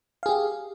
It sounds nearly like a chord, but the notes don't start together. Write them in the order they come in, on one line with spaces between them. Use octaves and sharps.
F5 G#4 G4